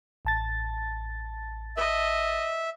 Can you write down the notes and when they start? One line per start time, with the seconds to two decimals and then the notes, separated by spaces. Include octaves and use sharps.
0.25 A1 A5 A6
1.77 D#5 E5